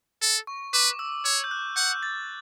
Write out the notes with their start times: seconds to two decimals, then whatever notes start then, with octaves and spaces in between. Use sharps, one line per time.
0.22 A4
0.47 C#6
0.73 B4 D6
0.99 E6
1.25 C#5 E6
1.44 G6
1.51 F#6
1.76 F#5 G6
2.03 A6